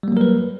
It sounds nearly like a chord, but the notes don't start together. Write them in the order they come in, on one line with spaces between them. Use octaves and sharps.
G3 A#3 F#3 A#4 B4